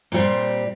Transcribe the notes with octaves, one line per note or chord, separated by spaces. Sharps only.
A#2 G3 C4